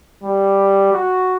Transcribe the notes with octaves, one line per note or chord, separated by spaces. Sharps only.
G3
F#4